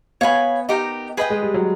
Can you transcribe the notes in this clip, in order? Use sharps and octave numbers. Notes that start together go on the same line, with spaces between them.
B3 C#5 F5 G#5 B5
D#4 G4 A#4
G#4 B4 D#5 G5
G#3
G3
F#3